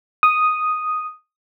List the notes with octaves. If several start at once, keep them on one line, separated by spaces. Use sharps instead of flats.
D#6